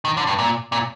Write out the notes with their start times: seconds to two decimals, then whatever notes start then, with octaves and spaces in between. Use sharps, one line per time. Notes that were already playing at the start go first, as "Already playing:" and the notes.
0.05 D#3
0.17 D3
0.27 G2
0.39 A#2
0.72 A#2